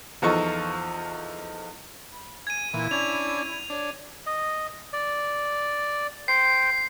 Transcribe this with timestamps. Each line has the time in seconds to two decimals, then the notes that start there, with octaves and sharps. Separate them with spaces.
0.22 E2 F3 D#4 A4 C#6
2.12 B5
2.47 G#5 G#6 D#7
2.74 A#2 E3 E4
2.91 C#4 D4 G#6 F7
3.70 D4 C#5
4.27 D#5
4.93 D5
6.28 C5 G5 C7